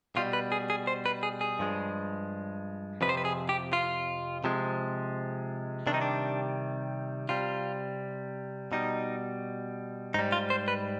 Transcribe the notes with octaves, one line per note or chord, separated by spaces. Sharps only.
B2 G3 F4
B4
G#4
G#4
C5
B4
G#4
G#4
G2 F3 G#3
F2 C3 F3 B4
C5
B4
G#4
G4
F4
C3 F3 G#3
C3 D#3 G3 D4
D#4
D4
C3 G3 F4
B2 G3 D#4
G#2 G3 D#4
F4
C5
B4